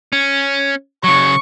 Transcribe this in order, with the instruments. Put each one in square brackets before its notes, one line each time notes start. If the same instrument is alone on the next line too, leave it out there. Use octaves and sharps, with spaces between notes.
[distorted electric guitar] C#4
[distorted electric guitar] C#3 F#3 [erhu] C#6